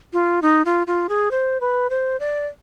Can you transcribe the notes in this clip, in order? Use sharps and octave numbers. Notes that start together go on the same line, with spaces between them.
F4
D#4
F4
F4
G#4
C5
B4
C5
D5